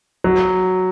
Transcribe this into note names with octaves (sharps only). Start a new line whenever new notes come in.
F#3